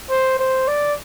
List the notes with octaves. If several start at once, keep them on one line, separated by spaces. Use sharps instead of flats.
C5
C5
D5